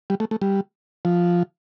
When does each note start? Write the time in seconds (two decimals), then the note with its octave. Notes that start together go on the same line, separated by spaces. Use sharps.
0.10 G3
0.20 A3
0.31 A3
0.42 G3
1.05 F3